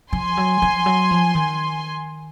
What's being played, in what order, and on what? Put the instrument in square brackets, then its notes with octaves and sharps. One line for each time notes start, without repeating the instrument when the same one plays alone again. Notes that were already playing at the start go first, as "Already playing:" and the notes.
[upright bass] F3 [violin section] G#5 C6
[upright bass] F#3
F3
F#3
F3
D#3